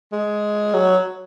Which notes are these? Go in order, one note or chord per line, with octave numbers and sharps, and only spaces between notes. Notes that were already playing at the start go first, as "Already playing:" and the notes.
G#3
F#3